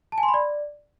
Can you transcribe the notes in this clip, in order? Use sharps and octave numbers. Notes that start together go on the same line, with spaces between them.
A5
G#5
C6
B5
D5